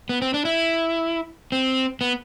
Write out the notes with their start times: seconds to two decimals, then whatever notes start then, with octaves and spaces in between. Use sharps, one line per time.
0.09 B3
0.22 C4
0.34 D4
0.45 E4
1.52 C4
2.01 B3